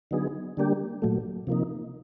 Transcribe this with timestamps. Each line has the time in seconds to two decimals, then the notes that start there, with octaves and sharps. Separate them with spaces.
0.11 D3 F#3 B3 D#4 G#4
0.57 D3 G3 A#3 D4 G4
1.02 A#2 F#3 A3
1.47 C3 F3 A#3 D#4